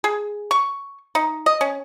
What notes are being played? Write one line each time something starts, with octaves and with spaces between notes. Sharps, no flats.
G#4
C#6
D#4
D#5
C#4